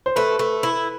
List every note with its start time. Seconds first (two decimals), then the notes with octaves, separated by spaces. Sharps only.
0.06 C5
0.16 A3 B4
0.39 A3
0.63 E4